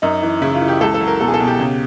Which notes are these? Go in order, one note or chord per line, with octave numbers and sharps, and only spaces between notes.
F#2 D#4
E3
C#3 E4
F4
E3
G4
C#2 A4
A4
F#3
A#4
B2 A4
G#4
A4
B2
G4
C#3